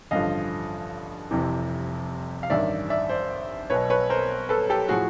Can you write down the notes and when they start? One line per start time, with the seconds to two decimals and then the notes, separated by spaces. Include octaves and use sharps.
0.11 A1 G2 D3 F3 D#5 F5
1.31 F1 F2 C3 E3
2.43 F5
2.50 A1 G2 D#3 D5 E5
2.90 D5 E5
3.09 C5 D5
3.70 B1 B2 B4 C#5
3.90 B4 C#5
4.10 A#4 C5
4.49 A4 B4
4.70 G4 A4
4.89 A2 F3 F#4 G#4